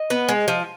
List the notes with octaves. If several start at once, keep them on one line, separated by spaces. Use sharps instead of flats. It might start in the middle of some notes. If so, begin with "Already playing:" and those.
Already playing: D#5
B3
G#3
F3